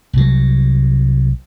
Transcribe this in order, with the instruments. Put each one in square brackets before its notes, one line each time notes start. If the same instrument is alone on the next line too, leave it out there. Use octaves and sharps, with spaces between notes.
[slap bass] C2 F#3